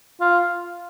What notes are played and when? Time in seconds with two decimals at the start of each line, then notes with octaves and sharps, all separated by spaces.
0.21 F4